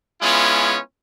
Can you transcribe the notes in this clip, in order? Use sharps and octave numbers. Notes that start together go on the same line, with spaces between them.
G#3 B3 C#4 E4 F4